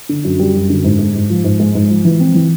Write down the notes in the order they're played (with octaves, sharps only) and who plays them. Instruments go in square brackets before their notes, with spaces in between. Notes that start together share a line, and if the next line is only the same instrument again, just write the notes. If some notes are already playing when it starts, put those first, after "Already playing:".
[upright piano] D3
F#2
G3
F#2
D3
G#2
G#3
G#2
F3
G#2
G#3
G#2
F3
E3
C4
E3